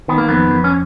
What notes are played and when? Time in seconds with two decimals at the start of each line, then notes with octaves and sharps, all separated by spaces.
0.08 D#3 B3
0.18 A#3
0.28 F2 B3
0.51 F2
0.64 C#4